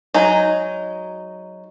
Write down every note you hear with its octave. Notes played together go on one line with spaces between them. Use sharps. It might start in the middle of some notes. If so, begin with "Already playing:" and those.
F#3 G#3 D#4